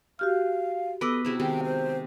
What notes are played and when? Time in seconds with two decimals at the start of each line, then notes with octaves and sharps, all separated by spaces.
0.19 F#4 G4 F5 F6
1.01 B3 A4 B4 D#5 D6 E6
1.25 C3 E4 F#4 G#4
1.40 C3 D#3 G#3 G5
1.64 C5